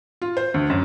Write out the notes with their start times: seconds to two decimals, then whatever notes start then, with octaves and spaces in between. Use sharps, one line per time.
0.22 F4
0.37 C5
0.54 D2
0.70 F#2